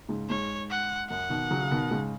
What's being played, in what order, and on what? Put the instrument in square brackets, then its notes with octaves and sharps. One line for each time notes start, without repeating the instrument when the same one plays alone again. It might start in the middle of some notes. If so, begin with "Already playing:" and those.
[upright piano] G#2 C#3
[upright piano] G#2 [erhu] C#5
[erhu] F#5
[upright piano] F#2 [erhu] F#5
[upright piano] B2 D#3
C#3 F#3
C#3
B2 D#3
G#2 C#3